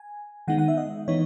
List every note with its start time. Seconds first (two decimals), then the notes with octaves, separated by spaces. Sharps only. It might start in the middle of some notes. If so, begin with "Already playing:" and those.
Already playing: G#5
0.48 D#3 G#3 B3 D#4 F#5
0.58 F#5
0.68 E5
0.77 D#5
1.08 E3 B3 D#4 C#5